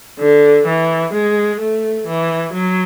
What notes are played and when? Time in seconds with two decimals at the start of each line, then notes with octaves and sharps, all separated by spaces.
0.20 D3
0.67 E3
1.13 G#3
1.60 A3
2.08 E3
2.54 F#3